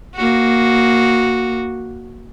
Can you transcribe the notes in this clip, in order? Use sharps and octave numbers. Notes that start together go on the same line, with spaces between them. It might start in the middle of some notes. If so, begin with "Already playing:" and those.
A#3 F#4